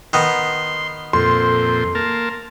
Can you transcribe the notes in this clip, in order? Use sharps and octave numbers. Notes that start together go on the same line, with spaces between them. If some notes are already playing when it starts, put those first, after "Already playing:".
D#3 B3 C6
F2 A#2 A4 C5 C6
A#3 A#4 A5